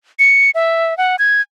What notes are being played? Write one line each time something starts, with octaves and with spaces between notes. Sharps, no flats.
C#7
E5
F#5
G#6